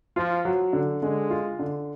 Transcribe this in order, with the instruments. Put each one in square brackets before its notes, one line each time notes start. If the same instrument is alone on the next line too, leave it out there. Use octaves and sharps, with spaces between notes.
[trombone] F3 [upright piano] F4
[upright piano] F#3
D3
[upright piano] D3 [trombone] G#3
[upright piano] F4
D3